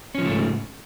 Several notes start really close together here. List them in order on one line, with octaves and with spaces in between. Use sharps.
C#4 F3 C#3 A3 G#2